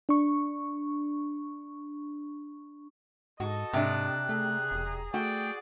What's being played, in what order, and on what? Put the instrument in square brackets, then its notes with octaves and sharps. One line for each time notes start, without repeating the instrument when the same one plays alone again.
[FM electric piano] D4 C#6
[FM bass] G#2 [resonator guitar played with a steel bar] F#4 [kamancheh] A4 D#5
[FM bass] G#2 [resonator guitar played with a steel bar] C3 D4 [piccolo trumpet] F#6
[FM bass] A3 [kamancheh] G#4 A#5
[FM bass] E1
[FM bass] A3 [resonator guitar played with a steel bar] F#4 [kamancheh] G#4 D5 [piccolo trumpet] G5